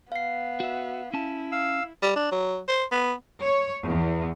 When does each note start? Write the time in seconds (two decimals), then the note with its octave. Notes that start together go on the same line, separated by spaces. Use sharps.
0.12 B3 F5 C7
0.60 F#4 E5
1.14 C#4 E4 A5
1.52 F5 E6
2.02 G3
2.16 D4
2.32 F#3
2.68 C5
2.92 B3
3.43 C#5
3.84 E2